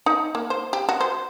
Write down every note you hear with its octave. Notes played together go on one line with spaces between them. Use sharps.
D#4
A#3
C5
G4
F#4
C5